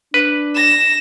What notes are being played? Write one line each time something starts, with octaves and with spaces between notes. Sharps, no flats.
D4 B4
A#6 E7